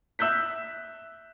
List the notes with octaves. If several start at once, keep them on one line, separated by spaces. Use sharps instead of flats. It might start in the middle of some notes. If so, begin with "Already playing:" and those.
E5 E6 F#6 G6 B6